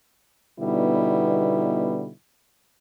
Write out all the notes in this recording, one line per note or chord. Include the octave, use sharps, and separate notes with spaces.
B2 D3 G3 B3 D#4 E4